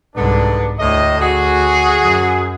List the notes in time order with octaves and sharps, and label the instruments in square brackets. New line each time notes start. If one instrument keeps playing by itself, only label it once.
[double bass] C2 G#2 [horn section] D3 B3 D4
[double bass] D2 [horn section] A2 D#5
[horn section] F#4 G#4
[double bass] F#2